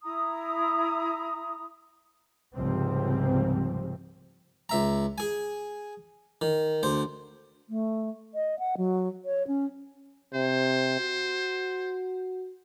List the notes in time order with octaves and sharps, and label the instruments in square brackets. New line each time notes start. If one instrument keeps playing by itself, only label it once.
[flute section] E4 A#5 D#6
[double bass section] C#2 G#2 C3 F3 G3 C4
[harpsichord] C#2 E5 A#5
G#4 G#5
D#3
D2 C5
[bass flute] A3
D#5
F#5
F#3
C#5
C#4
[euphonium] C3 [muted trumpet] C5
[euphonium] F#4